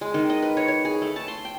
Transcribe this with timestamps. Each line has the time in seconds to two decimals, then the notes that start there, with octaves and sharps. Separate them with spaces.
0.01 G#3
0.14 D#3
0.30 D#5
0.42 B4
0.57 C#5
0.68 C#5
0.85 G#4
1.02 A3
1.16 A5
1.28 C6
1.45 G5